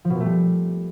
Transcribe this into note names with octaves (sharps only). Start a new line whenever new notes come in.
F3
B2
A#2
A3
G3